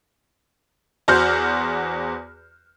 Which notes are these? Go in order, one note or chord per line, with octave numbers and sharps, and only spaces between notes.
E2 F#4 C5 F6 G6